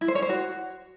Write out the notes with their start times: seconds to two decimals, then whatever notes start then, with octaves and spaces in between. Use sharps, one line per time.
0.01 E4
0.08 C5
0.15 C#5
0.22 C5
0.29 F#4